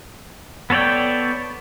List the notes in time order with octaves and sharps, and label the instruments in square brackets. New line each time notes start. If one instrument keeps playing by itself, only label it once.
[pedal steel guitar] B3 A4 C#5 D5 G5